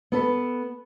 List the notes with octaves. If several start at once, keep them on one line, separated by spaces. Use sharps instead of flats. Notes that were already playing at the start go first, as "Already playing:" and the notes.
B3 A4 B4